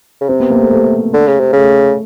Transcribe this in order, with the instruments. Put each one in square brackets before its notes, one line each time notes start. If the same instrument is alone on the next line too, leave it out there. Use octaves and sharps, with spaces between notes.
[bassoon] C#3
[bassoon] C3 [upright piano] C4
[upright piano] B3
A#3
A3
A3
[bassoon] D3
C#3
C3
[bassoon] C#3 [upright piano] A3